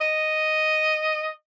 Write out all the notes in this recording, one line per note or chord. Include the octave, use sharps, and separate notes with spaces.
D#5